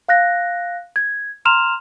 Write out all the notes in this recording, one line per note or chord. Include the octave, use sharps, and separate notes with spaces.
F5 F#6 A#6
G#6
A#5 C6 F6 E7 F7